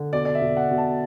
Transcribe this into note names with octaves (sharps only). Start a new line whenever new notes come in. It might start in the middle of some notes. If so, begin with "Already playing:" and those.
Already playing: D3
B2 D5
D5
E5
B2
F#5
B2
A5